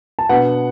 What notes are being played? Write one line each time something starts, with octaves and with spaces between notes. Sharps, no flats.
A5
B2 B3 D4 F#5